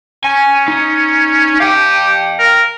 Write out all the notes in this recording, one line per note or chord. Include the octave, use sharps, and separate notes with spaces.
C#4 G#5
D#4
G4 F5 G5
A#4